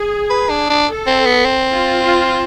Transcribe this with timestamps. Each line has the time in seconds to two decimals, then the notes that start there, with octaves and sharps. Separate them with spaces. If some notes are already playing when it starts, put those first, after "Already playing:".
Already playing: G#4
0.30 B4
0.50 D4
0.69 D4
0.88 A4
1.07 C4
1.26 B3
1.45 C4
1.75 F4
2.03 F4